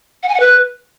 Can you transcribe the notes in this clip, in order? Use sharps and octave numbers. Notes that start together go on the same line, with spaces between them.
F#5
G#5
F#5
B4